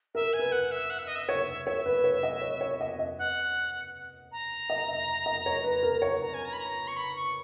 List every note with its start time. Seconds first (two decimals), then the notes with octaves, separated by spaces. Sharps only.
0.15 A#4 E5
0.33 G#5
0.39 B4
0.52 F#5
0.71 E5
0.90 F#5
0.99 E5
1.06 D#5
1.15 E5
1.29 C#5
1.67 C#5 E5
1.86 B4
2.04 C#5
2.23 D#5
2.42 C#5
2.61 C#5
2.81 D#5
2.99 D#5
3.18 F#5
4.32 A#5
4.70 D#5
4.88 E5
5.26 D#5
5.46 C#5
5.64 B4
5.83 A#4
6.02 C#5
6.22 A#5
6.34 G#5
6.45 A#5
6.53 B5
6.60 A#5
6.88 C#6
6.97 B5
7.16 C#6